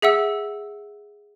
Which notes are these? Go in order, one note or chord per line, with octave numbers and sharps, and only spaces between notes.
G#4 E5 F#5 E6